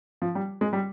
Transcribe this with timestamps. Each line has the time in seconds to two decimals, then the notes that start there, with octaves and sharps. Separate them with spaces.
0.22 F3
0.35 G3
0.61 G#3
0.73 G3